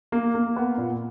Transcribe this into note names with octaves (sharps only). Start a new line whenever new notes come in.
A#3
A#3
B3
A#2